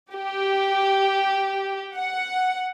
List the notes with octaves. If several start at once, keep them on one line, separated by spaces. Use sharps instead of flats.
G4
F#5